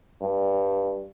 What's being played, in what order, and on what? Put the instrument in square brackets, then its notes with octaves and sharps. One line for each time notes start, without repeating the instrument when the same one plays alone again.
[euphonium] G2